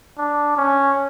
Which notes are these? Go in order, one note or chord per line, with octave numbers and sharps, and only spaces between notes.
D4
C#4